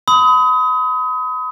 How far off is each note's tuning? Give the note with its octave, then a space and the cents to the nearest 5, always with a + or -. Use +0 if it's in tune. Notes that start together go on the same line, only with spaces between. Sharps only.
B5 +35 D#6 +30